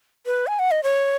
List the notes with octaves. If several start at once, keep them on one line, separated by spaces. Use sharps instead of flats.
B4
G#5
F#5
D#5
C#5